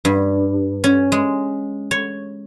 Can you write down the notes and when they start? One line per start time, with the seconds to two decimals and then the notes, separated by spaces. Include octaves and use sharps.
0.05 G2
0.84 C#4
1.12 G#3
1.91 C#5